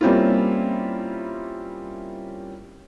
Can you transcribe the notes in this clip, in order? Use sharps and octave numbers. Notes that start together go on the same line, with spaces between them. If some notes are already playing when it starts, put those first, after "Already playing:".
G3 A#3 C4 C#4 E4 F4